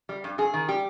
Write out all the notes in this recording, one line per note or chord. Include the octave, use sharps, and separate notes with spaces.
G3
G2
G2 G#4
D#3
G3 G4